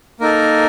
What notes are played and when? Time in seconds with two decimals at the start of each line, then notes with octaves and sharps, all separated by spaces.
0.20 A#3 D#4 A4 A#4